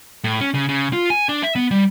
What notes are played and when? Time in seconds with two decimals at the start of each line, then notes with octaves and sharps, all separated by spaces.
0.24 A2
0.41 C#4
0.55 C#3
0.69 C#3
0.93 F4
1.10 G#5
1.29 D4
1.43 E5
1.56 B3
1.71 G3